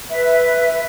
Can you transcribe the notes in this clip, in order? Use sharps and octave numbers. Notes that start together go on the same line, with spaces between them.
B4 E5